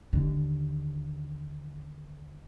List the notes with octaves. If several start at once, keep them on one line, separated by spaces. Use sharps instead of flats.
D#2 D3